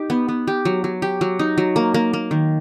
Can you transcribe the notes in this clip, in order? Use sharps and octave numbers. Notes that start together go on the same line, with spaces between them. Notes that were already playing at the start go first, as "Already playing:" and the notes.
Already playing: D#4 G4
B3
B3
G4
F#3
F#3
G4
F#3
D#4
F#3
A#3
A#3
A#3
D#3